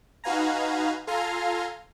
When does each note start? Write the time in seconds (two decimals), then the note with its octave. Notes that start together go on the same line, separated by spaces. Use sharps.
0.24 D#4 F#4 B4 F5 G#5 A#5
1.07 F4 A4 F5 G#5 A#5 C6